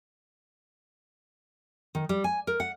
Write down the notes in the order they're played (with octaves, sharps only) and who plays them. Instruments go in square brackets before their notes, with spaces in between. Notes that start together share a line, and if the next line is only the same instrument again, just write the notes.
[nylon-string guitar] D#3
G3
G#5
A#4
F#5